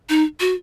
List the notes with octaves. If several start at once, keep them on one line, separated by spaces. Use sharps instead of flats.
D#4
F#4